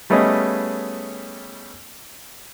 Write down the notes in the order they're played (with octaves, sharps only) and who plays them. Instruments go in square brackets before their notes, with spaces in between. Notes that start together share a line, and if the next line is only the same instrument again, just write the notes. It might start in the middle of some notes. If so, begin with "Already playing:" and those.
[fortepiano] G3 A3 B3 C#4 G#4 D#5